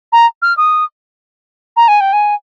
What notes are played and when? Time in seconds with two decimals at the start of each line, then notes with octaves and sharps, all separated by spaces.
0.12 A#5
0.42 F6
0.57 D#6
1.77 A#5
1.88 G#5
2.01 G5
2.13 G#5